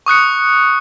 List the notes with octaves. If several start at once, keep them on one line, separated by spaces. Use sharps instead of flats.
C#6 D#6 F#6 C#7